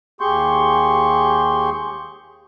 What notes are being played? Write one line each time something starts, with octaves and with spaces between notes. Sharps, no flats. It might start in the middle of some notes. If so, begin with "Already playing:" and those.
D#2 G4 G#4 C6 C#6 G6